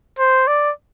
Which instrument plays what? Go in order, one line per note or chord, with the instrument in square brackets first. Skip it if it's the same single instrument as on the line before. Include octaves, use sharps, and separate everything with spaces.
[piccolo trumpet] C5
D5